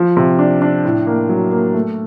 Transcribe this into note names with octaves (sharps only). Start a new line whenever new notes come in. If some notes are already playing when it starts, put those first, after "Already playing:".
Already playing: F3
C3
D4
D4
A2
A#3
F#3
A#3
A3